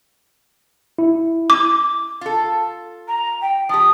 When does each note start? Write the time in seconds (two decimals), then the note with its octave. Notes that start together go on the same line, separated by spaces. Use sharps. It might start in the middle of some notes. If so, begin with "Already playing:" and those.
0.99 E4
1.50 D6
2.21 F4 A4
3.08 A#5
3.42 G5
3.69 F3 G4 D#6